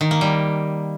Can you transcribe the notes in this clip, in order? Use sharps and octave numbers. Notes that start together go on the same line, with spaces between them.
D#3
A#3
G3